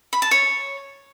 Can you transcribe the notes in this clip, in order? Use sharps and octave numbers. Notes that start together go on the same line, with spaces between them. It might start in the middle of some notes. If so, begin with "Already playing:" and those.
B5
A5
C#5